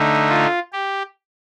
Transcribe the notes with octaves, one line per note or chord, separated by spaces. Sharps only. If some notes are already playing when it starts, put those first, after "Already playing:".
Already playing: D3 A3 D#4
F4
G4